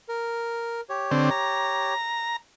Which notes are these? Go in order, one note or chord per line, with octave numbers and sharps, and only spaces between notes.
A#4
G4 C#5
D3 C4
A#5